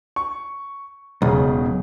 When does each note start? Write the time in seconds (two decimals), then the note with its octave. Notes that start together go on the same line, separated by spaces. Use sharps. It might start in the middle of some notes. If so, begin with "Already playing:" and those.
0.16 C#6
1.22 E1 B1 C#3